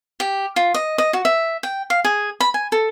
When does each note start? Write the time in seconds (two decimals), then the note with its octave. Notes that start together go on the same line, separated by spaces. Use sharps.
0.20 G4
0.56 F4
0.74 D#5
0.98 D#5
1.13 F#4
1.25 E5
1.63 G5
1.90 F5
2.05 G#4
2.40 B5
2.54 G#5
2.72 A4